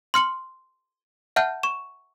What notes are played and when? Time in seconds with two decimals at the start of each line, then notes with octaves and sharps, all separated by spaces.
0.14 C6 F6 C#7 F#7
1.36 E5 F#5 A5 F6 G6
1.63 C#6 E7